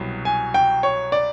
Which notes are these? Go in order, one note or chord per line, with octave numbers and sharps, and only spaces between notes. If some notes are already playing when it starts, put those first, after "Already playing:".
Already playing: C2 B2 F#3
G#5
G5
C#5
D5